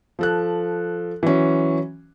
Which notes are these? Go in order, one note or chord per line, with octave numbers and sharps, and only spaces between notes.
F3 A4 F#6
E3 F#3 C#4